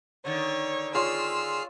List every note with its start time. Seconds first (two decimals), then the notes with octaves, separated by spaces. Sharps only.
0.25 D3 D#3 C#5
0.95 F4 G#4 C#5 C6 E6 F6 C7